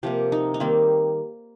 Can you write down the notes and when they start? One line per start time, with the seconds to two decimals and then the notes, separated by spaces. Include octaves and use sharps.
0.03 C3 F3 A#3 G4
0.32 D#4
0.54 D#4
0.60 D#3 G3 A#3 C4